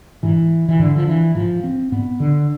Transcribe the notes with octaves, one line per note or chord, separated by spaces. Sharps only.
G#2 E3
E3
G#2 D3
F3
E3
G#2 F3
C4
G#2 B3
D3